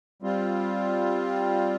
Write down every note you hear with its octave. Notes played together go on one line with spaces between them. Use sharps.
G3 C4 F4